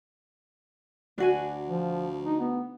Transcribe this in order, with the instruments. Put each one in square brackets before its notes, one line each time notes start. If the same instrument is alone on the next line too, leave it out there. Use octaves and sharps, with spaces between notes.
[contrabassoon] D2 [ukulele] D4 F#4 G#5
[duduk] F3
D#4
B3